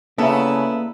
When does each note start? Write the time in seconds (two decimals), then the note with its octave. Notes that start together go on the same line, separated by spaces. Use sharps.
0.18 C#3 A#3 B3 E4 A4 D5 A#5